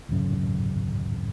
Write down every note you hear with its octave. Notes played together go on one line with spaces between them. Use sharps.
D1 G#1 F#2 C#3